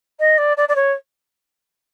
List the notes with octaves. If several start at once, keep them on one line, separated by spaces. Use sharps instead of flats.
D#5
D5
D5
D5
C#5